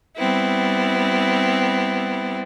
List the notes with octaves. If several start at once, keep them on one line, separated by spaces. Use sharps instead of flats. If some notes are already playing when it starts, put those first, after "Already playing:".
G3 B3 C4 E4